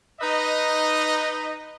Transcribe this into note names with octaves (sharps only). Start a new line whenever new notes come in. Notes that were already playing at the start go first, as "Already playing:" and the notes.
D#4 B4 D#5